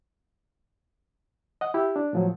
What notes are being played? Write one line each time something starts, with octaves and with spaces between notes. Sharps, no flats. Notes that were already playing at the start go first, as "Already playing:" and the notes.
D#5 F#5
E4 G4
D4
A2 F3 F#3